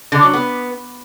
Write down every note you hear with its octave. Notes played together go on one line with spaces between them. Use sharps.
D3
F#3
B3